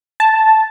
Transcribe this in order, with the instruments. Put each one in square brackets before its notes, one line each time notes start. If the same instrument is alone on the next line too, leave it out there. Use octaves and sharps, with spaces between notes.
[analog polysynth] A5